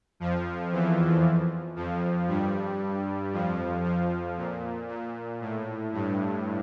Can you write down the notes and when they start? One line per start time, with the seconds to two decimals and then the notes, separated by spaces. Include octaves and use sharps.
0.20 F2 F3
0.71 E2 E3
1.76 F2 F3
2.28 G2 G3
3.32 F2 F3
3.84 F2 F3
4.37 A#2
4.89 A#2
5.41 A2
5.93 G2